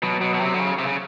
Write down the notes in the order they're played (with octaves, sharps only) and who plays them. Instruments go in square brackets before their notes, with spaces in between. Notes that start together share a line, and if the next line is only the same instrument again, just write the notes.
[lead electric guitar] B2 [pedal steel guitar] F#3
[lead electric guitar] B2
B2
C3
D3
C#3
C3
C#3